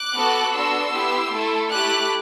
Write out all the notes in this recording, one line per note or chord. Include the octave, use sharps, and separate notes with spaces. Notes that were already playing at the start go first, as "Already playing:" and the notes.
Already playing: D6 F#6
B3 F#4 A4
B3 D4 F#4 A4 C6 E6
B3 E4 G4
A3 E4 A4
A3 E4 G4 D6 F#6